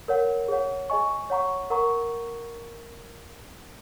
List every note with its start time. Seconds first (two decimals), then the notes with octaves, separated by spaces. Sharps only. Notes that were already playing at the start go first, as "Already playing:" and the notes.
0.08 A#4 C#5 F#5
0.48 G#4 C#5 F#5
0.90 G#4 D#5 G#5 C#6
1.30 C#5 F#5 A#5 C#6
1.70 A#4 F#5 A#5 C#6